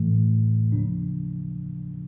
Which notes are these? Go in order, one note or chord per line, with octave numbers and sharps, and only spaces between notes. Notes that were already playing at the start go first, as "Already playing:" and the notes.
Already playing: A2 E3 A3
D#2 C#3 F3 A#3 D4